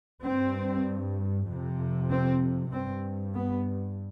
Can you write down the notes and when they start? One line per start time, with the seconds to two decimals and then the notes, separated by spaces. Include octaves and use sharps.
0.23 G2 C4
1.48 F2 C3
2.10 C4
2.72 G2 C4
3.35 B3